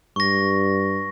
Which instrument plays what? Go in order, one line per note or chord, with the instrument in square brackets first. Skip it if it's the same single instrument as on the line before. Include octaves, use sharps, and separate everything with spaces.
[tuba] G2 [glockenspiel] C#6 A#6